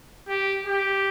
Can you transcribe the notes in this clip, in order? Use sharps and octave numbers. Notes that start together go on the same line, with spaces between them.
G4
G4